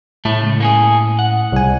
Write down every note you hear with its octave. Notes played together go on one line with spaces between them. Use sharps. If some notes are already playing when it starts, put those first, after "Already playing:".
A2 A3
C#2
A#3 C#4 G#4
F#5
C2 G#5